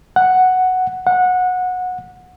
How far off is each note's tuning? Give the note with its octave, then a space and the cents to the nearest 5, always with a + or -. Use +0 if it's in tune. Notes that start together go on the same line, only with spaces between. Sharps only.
F#5 +0
F#5 -20